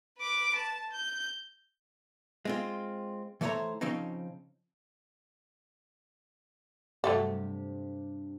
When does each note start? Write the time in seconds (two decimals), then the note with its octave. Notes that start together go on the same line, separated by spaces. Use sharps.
0.19 B4 D6
0.56 A5
0.92 G6
2.45 G#3 C4 F4
3.41 E3 A3 E4 C5 C#5 A#5
3.81 C#3 F3 C4 C#4 D#4
7.04 G2 C3 F#3 A3 A4